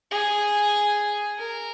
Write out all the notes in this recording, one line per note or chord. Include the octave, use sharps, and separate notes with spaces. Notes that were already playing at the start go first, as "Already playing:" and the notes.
G#4
A#4